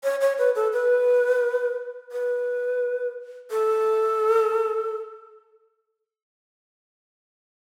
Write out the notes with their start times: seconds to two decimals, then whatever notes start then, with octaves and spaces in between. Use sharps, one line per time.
0.04 C#5
0.21 C#5
0.38 B4
0.56 A4
0.73 B4
2.12 B4
3.51 A4